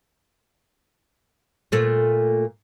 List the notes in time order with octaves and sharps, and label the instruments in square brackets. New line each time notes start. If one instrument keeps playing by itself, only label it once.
[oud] A#2 A3